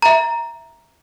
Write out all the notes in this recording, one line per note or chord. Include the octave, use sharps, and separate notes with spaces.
E5 A#5